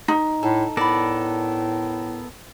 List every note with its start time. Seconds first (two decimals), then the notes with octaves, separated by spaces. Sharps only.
0.08 D#4
0.43 A2 A4
0.77 A2 B3 A4 A#4 D5 B5